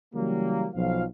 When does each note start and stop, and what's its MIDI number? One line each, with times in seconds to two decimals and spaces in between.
0.14 0.68 49
0.14 0.68 52
0.14 0.68 54
0.14 0.68 55
0.14 0.68 58
0.74 1.05 35
0.74 1.05 53
0.74 1.05 77